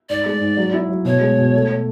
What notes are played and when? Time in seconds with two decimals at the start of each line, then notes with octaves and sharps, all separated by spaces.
0.09 G#2 D5
0.26 G#3
0.41 G#2
0.57 F#3
0.74 E4
0.89 F#3
1.05 B2 C#5
1.21 G#3
1.38 B2
1.54 A3